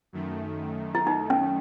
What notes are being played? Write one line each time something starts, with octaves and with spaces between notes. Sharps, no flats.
F#2 D#3 A3
E4
D#4
C#4